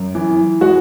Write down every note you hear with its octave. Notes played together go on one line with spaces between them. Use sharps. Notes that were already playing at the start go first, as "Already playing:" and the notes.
Already playing: F#2
E3
G#3 F#4